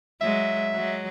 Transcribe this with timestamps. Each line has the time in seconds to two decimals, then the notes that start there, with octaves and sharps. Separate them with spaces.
0.21 F#3 G#3 E5
0.74 F#3 G#3